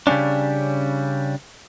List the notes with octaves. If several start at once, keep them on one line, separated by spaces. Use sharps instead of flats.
C#3 G3 A#3 C#4 D4